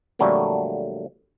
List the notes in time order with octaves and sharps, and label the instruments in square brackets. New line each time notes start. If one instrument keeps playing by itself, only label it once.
[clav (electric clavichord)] F2 A#2 D3 F#3 G3 A3